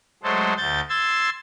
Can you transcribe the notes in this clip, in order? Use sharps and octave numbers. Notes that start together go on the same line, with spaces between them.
F#3 G#3 A3 A4 C5
D2 G6 A6
C6 E6 G#6 A6